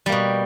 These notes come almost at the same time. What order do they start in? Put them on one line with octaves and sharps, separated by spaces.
G3 A#3 B2